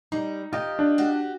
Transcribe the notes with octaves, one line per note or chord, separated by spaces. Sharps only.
G3 D#4
F4 G4 D#5 G5
D4
F#4 G4